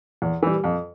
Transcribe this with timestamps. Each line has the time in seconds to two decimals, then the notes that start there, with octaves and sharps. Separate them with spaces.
0.22 E2
0.43 E3 G3
0.64 F2